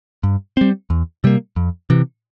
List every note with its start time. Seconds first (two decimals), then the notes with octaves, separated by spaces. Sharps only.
0.23 G2
0.57 G3 C4
0.90 E2
1.24 C3 G3 A#3
1.56 F2
1.90 C3 E3